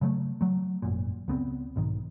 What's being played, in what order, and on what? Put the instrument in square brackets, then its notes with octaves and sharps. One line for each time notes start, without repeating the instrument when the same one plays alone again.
[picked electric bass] C#3 F#3 G#3 A3
F#3 A3
G#1 F#2 A#2
C#2 B3 C4
B1 G#2 D#3